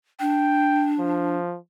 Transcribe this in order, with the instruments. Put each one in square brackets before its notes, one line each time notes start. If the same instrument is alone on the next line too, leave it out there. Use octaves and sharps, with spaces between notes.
[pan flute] D4 [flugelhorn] G5
[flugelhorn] F3